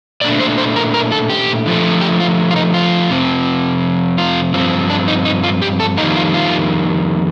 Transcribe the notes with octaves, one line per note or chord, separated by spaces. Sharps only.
A#2 A3 D4 D5
C5
C5
A#4
A#4
A4
G4
D3 F3 A3
G4
F4
F4
D#4
F4
F2 C3 F3 C4
F4
G2 F3 C4
D4
D#4
D#4
F4
G4
A4
F2 D#3 G3 A#3 D#4
F4
F4